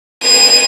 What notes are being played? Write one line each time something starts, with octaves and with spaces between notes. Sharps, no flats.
D#7